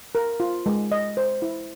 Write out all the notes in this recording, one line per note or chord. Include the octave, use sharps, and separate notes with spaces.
A#4
F4
G#3
D#5
C5
E4